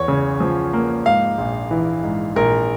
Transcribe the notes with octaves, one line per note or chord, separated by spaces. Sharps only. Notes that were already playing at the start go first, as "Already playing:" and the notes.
Already playing: E2 C#5
C#3
F3
A#3
G#2 F5
A#1
E3
G#2
A#1 A#4